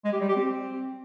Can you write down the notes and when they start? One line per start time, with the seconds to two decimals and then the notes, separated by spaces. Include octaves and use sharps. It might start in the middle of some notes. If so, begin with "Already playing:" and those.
0.05 G#3
0.13 G4
0.21 G3
0.28 G4
0.36 C4